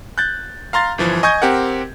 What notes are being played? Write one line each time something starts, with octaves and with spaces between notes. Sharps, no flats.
F#6 G6 A6
F5 A#5 C6 A6
G1 E3 F3
D#5 G#5 C#6 D#6 G6 G#6
C4 G4 A#4 F#5